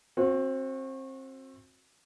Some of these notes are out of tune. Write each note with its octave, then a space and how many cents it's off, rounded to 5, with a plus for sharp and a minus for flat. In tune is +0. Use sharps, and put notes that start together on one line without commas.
C4 +25 F#4 -25